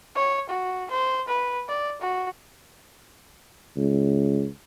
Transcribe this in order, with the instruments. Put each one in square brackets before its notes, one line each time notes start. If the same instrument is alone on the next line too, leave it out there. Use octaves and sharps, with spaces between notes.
[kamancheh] C#5
F#4
C5
B4
D5
F#4
[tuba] C#2